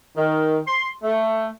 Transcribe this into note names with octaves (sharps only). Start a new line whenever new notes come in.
D#3
C6
A3